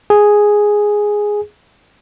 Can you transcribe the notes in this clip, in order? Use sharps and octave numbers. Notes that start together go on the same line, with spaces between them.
G#4